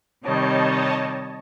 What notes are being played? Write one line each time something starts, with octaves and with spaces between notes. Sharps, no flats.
C3 D#3 G3 C#5 D#5 A5